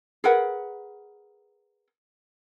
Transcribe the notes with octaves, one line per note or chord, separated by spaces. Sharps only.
G#4 A#4 B4 F#5